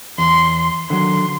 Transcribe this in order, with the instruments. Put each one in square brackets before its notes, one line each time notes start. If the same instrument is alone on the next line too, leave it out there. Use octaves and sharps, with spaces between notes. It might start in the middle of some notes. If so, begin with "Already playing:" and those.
[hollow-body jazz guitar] E2 [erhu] C6
[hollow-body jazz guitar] D3 D#3 F#3 [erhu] C6